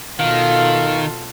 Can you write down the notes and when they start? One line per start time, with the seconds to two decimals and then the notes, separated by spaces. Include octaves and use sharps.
0.20 B2 D#3 F4 A4 F5